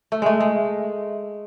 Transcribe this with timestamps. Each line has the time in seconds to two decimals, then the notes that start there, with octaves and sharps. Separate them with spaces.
0.12 A3
0.22 G#3 A3
0.40 G#3